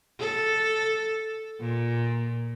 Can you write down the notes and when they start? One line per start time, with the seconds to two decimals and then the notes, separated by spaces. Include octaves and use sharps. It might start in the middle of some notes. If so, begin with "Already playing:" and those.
0.20 A4
1.60 A#2